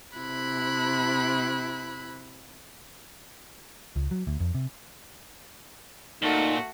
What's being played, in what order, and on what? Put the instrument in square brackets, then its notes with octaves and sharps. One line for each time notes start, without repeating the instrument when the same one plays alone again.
[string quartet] C3 E4 B5 F#6
[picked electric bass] C#2
F#3
D2
F2
C3
[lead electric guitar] A#2 [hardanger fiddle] A3 F#4 [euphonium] D#4